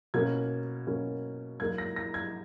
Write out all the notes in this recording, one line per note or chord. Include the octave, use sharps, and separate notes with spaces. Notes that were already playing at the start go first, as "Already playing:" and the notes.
B2 A#3 C#4 G#6
B2 A#3 C#4
G#2 F#3 A#3 D#4 G#6
A#6
A#6
G#6